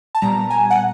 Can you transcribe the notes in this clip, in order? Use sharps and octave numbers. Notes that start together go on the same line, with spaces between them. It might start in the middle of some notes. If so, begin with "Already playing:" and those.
A5
A#2 G3 B3 A#5
G#5
F#5